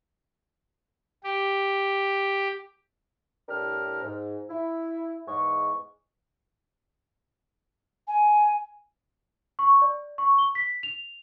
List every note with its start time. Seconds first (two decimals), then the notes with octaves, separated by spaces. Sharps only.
1.24 G4
3.49 C2 A2 D4 G4 A#4 F6
4.03 G#2
4.50 E4
5.28 E2 G#2 D#5 C#6
8.08 G#5
9.59 C#6
9.82 D5
10.18 C#6
10.38 G7
10.55 B6
10.83 F7